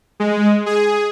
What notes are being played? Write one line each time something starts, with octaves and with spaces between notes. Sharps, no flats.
G#3
G#4